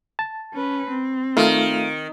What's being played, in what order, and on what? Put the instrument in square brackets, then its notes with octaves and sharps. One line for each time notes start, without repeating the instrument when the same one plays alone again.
[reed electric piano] A5
[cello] C#4 B4
C4
[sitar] D#3 [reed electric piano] A3 F4 F5